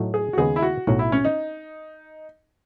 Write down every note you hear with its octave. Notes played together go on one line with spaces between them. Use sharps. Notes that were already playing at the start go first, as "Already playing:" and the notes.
Already playing: A2 F#3 A3 D#4
G#4
F#4
D#2 C#3 G#3 B3 G#4
E4
F#4
B1 A2 F#3 F#4
E4
C#4
D#4